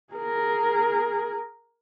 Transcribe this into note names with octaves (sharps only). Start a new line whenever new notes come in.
G#4 A#4